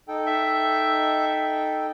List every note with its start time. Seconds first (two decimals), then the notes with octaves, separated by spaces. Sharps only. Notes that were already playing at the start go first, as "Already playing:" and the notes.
0.08 D#4 A4 G5
0.26 E5